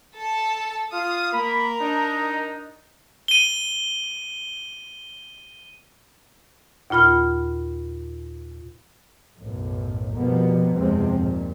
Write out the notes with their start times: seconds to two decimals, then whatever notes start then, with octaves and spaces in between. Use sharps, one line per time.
0.15 A4 A5
0.92 F4 F5 D#6
1.33 A#3 A#4 B5
1.81 D4 D#4
3.28 D#7 G7
6.90 D#2 A#2 F4 B5 F6
9.39 B1 F#2 A2
10.15 F1 B2 F3 G3 A#3 B3
10.73 F#1 E2 C3 F3 G#3 C4
11.18 D#2 A#2